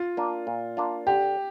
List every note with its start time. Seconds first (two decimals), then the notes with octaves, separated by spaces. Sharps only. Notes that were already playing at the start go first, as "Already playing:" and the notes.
Already playing: F4
0.17 A#3 D4
0.47 A#2
0.77 A#3 D4 F4
1.07 D3 G4